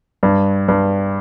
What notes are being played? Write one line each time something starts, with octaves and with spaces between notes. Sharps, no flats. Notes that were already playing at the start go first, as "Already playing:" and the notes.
G2
G2